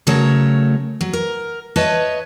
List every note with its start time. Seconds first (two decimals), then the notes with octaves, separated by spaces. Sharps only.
0.07 C#3 F#3 A3 A#4 C#5
1.01 F#3
1.13 A#4
1.76 B4 C#5 D#5 E5 A5